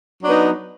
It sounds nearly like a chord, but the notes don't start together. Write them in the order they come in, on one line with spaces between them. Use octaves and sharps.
F#3 D4 B3 D#4